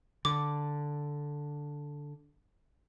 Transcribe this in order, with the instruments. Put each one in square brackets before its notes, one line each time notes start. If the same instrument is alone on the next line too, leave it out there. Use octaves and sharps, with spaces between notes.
[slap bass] D3 [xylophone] D6